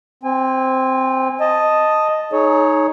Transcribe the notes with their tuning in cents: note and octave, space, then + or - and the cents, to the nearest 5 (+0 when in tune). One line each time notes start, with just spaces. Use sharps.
C4 +0 G#5 -30
D#5 +0 A5 +0
D#4 +0 G#4 +35 C#5 +0